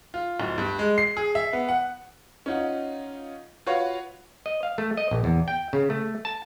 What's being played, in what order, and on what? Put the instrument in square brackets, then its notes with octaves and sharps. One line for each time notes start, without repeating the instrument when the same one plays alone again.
[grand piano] F4
D1
G2
G#3
C7
G#4
E5
B3
F#5
C#4 D#4 F4 F#5
F4 F#4 B4 C#5 F5
[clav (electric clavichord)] D#5
F5
A3
D#5
A#1
E2
G5
C#3
A3
A5